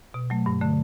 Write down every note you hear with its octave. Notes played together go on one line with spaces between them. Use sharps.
B2
F#3 A3
G2
D3 A3